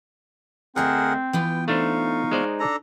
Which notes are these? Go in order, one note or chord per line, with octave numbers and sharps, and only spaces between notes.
D2 C4 G#4 A#4 D#5 E5 F#5
E3 B3 F4 G5
A3 D4 D#4 C5 F5 C#6
G#3 C5 D5
D4 A4 A#5